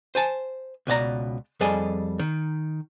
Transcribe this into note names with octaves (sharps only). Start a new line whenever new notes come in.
C5 G#5 A5
C#2 B2 D5 A#5
F2 G3 G#4 A4 D#5
D#3